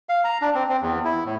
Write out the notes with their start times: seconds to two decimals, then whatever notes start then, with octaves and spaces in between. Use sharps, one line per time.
0.09 F5
0.24 A#5
0.42 D4
0.55 C4
0.69 C4
0.81 E2
1.05 E4
1.25 A2